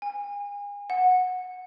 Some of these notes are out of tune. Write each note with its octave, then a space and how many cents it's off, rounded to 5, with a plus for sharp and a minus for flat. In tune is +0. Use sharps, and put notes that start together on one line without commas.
G#5 -35
F#5 -15